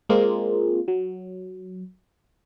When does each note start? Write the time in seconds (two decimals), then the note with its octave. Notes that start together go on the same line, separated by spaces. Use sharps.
0.09 G#3 A#3 C4 F4
0.88 F#3